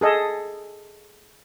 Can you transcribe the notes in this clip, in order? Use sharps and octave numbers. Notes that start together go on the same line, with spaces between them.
G#4 A4 D#5